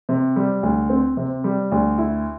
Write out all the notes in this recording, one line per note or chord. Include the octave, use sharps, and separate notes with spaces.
C3
G3
D2
C4
C3
G3
D2
E4